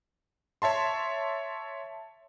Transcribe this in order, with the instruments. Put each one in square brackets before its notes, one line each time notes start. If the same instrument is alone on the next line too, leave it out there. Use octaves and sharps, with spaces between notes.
[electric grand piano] C#5 E5 A5 C6